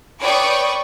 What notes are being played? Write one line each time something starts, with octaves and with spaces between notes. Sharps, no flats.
B4 C#5 D5 G5 C#6 D#6